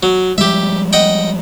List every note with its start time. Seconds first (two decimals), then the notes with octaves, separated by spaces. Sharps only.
0.03 F#3
0.38 F3 G3 G#3 G4 E5
0.93 D#5 F#5 G5